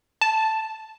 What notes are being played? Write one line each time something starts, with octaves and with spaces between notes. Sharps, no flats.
A5